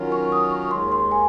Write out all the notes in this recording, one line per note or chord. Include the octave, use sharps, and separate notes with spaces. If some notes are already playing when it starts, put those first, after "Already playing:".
Already playing: D#3 F#3 C#4 F4 A#4
C#6
D#6
C#6
D#2 D#3 G#3 C6
C6
G#5